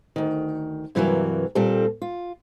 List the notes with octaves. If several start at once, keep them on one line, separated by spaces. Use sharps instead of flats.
D2 D#3
G2 C3 E3 F#3 G3 A#3
A#2 G3 C4 A4
F4